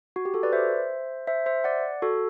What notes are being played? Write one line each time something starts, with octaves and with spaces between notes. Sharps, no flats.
F#4
G4
F#4 A4
B4 D5
C5 E5
C5 E5
C5 E5
D5 F#5
F#4 A4